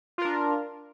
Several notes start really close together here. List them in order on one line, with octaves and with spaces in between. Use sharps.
F4 A#4 D4